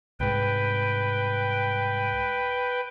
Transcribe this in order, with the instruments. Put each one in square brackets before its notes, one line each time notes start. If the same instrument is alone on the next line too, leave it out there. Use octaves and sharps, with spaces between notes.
[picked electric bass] C2 G#2 [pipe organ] B4 G5